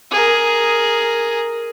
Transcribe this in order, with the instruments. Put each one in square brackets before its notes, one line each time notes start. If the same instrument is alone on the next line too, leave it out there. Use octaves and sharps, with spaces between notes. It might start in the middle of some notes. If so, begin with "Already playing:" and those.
[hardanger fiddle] G#4 A#4